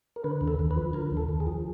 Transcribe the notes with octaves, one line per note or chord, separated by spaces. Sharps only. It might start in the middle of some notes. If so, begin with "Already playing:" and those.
A#4
D3 B4
D#2
A4
D#2
B4
F3
D3 A#4
D#2
A4
D#2
G#4
F3